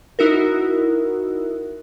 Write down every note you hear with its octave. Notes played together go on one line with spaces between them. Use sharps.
D#4 E4 F#4 A#4